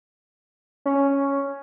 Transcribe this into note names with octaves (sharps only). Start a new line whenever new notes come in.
C#4